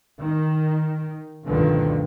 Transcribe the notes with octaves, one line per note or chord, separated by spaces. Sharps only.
D#3
D2 G2 B2 D3 D#3 F3